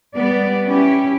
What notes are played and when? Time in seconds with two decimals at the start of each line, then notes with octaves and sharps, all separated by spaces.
0.14 G3 B3 D5
0.66 C#4 E4 G4